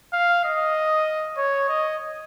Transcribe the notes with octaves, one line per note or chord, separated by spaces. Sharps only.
F5
D#5
C#5
D#5